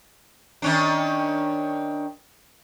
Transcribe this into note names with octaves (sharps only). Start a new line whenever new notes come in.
D#3 C#4 D4